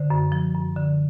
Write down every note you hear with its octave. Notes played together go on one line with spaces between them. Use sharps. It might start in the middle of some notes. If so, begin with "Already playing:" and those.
Already playing: D3 C5
F#2
F3
F#2
D3